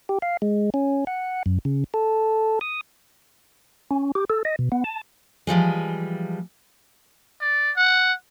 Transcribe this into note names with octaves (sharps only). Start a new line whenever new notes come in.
G4
F5
G#3
C#4
F#5
F#2
C#3
A4
D#6
C#4
G4
A4
D#5
B2
B3
A5
E3 F3 G3 G#3
D5
F#5